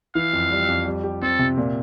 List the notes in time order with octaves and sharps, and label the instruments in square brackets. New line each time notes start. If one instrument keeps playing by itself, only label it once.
[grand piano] E3 [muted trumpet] F5
[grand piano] F2
G3
F2
G3
G4
[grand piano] C4 [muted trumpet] A4
[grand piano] C3
A#2